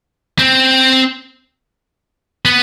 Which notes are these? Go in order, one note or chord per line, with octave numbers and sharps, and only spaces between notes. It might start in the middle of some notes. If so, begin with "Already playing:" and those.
C4
B3